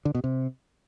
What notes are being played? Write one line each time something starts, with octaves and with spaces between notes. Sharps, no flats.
D3
B2
C3